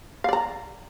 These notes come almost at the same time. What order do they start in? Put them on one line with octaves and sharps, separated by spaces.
F5 D5 A#5